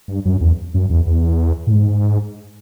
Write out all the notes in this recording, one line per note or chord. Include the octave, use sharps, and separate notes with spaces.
G2
F#2
E2
F#2
E2
E2
A2
G#2